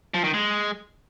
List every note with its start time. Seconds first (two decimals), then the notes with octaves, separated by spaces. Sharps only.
0.14 F3
0.24 D#3
0.34 G#3